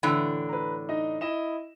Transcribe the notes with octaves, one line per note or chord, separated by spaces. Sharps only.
A2 D3 E3
B4 A#5
D#4 D#5
E4 D#5 E7